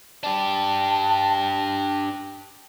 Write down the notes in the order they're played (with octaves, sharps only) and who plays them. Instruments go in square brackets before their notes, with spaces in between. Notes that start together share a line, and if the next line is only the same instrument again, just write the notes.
[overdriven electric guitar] D4 G4 [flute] A5